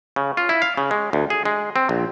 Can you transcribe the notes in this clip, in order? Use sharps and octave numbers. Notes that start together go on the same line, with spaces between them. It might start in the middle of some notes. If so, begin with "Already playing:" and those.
C#3
F4
E4
F5
C#3
G#3
D2
G#4
G#3
C4
A#1